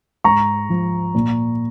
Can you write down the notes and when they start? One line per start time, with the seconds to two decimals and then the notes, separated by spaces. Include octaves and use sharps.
0.24 G#2 A#5 C#6
0.70 F3
1.15 A#2